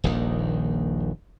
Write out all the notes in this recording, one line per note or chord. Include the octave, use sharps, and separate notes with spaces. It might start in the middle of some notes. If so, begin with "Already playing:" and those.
D#1 A#1 D#2 D#3